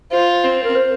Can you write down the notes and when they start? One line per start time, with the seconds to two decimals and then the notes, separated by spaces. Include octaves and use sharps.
0.11 F4 C5
0.44 C4
0.64 A#4
0.75 C5